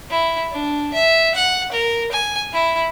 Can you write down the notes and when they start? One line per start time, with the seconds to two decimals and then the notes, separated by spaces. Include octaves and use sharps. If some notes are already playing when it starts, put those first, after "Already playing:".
0.11 E4
0.52 D4
0.93 E5
1.35 F#5
1.72 A#4
2.12 G#5
2.53 E4